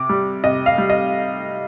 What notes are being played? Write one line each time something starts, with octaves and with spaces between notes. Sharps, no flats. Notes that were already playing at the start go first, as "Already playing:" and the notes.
Already playing: C3 D6
G3
C3 D#5
F5
G3
D#5